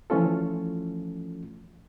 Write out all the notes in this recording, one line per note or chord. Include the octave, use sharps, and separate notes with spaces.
E3 F3 A3 C#4 F4 A4